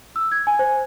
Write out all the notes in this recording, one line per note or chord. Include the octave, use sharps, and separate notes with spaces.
E6
G#6
G#5
C5